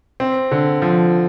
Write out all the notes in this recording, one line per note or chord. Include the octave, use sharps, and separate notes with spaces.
C4
D3
F3